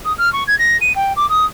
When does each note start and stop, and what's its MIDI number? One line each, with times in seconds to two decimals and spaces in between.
0.05 0.12 87
0.17 0.31 89
0.32 0.43 85
0.47 0.57 92
0.58 0.76 94
0.81 0.95 99
0.95 1.12 79
1.16 1.28 86
1.29 1.44 87